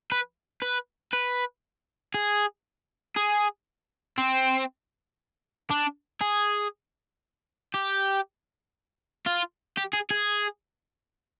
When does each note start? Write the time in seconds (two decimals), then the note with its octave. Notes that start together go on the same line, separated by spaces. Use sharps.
0.12 B4
0.62 B4
1.13 B4
2.14 G#4
3.16 G#4
4.18 C4
5.70 D4
6.21 G#4
7.74 G4
9.27 F4
9.77 G4
9.93 G#4
10.11 G#4